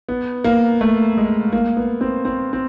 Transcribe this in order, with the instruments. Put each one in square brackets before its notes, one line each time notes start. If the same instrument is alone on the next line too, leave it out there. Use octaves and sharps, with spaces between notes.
[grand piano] B3
A#3
A3
G#3
A#3
B3
C4
C4
C4